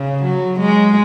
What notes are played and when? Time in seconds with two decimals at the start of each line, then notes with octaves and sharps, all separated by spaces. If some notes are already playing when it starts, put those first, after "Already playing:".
Already playing: C#3
0.23 F#3
0.60 G#3